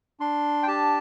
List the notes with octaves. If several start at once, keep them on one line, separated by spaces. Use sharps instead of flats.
D4 C6
G5
G4 A5